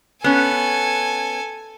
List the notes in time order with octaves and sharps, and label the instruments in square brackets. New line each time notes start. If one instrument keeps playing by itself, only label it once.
[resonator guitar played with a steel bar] B3 C#4 [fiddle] A4 G#5